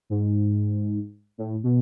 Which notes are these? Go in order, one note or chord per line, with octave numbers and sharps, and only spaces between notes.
G#2
A2
B2